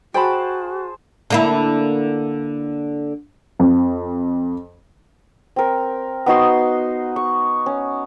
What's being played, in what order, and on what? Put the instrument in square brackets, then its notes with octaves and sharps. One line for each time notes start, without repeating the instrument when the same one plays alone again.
[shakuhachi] F#4 [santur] G#4 C5 A5 [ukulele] G5 B5
[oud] D3 A#3 E4
[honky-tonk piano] F2
[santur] C4 A#4
B3 D#4 F#4 C6
C#6
C#4